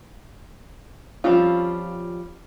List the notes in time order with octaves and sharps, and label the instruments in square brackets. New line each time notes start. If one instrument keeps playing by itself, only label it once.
[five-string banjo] F3 G3 C4 C#4 F4